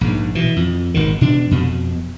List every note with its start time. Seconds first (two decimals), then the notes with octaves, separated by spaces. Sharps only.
0.01 A#1 G#2
0.35 B2 E3
0.56 F2
0.94 G#1 B2 D#3
1.21 B2 D4
1.51 F2 B2